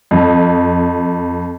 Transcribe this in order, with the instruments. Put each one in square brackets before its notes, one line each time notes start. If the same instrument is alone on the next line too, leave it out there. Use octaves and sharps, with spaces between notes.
[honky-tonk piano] F2